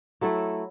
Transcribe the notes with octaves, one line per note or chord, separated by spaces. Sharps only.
F#3 A3 E4 A4